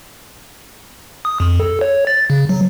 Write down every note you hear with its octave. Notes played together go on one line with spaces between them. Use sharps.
D#6
F2
A4
C#5
A6
C#3
F#3